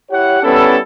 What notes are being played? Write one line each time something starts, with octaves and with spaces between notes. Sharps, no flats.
E4 G4 C#5 F#5
G3 B3 C#4 E4 A4